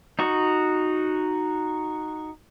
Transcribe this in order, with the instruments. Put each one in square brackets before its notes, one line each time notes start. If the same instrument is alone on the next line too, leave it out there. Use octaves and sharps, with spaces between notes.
[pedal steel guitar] D#4 F#4 C#6